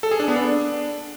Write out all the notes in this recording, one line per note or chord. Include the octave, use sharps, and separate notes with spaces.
A4
G#4
D4
B3
D4